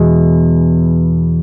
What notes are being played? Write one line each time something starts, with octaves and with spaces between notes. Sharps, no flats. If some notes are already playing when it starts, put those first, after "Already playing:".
Already playing: E2 B2 G#3